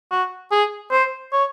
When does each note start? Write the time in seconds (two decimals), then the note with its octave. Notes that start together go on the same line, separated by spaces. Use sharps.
0.11 F#4
0.52 G#4
0.91 C5
1.32 C#5